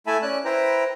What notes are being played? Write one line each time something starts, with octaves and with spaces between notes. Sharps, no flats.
A3 E4 E5 G#5 A5 B5
C#4 D5 F#6
E4 B4 C5 G5 A#5